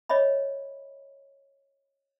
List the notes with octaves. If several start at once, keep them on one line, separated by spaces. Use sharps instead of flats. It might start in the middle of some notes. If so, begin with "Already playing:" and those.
C#5 D#5 E5 B5